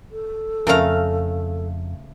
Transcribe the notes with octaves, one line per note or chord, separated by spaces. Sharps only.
A4
F2 C#3 A3 A#4 F5 A#5